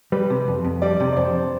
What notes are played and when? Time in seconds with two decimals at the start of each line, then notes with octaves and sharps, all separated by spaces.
0.12 G3 B4
0.30 C3
0.48 F2
0.64 F2
0.82 G3 D5
1.00 C3
1.12 D5
1.16 F2 C5